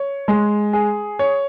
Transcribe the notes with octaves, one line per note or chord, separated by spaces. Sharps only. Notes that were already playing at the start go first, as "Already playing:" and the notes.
Already playing: C#5
G#3
G#4
C#5